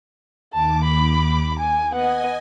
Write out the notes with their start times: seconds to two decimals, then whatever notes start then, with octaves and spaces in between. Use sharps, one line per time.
0.53 D#2 A5 D6
0.84 B5
1.59 G#5
1.93 B3 D#5 F#5 G#5